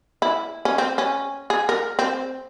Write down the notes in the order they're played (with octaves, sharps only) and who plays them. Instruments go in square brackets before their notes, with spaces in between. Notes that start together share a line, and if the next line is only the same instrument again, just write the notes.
[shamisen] E4
C#4
C4
C#4
G#4
A#4
C4